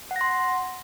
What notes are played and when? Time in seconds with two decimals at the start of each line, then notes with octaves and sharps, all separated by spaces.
0.11 F#5
0.16 A#6
0.21 C6